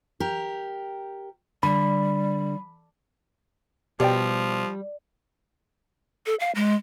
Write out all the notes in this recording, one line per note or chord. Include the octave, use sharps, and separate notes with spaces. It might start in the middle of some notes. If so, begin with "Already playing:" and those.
G4 A#4
D3 G3 B5
B2 F3 G3 G4 D5 G5
A4
F5
G#3